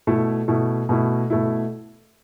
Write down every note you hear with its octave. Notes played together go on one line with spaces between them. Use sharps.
B2 A3 E4
B2 A3 E4
B2 A3 E4
B2 A3 E4